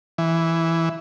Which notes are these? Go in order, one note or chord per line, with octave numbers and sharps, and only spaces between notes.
E3